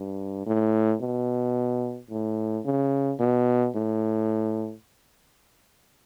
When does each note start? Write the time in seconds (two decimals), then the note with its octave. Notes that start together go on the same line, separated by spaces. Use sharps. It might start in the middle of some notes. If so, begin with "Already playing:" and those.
Already playing: G2
0.47 A2
1.02 B2
2.11 A2
2.65 C#3
3.20 B2
3.75 A2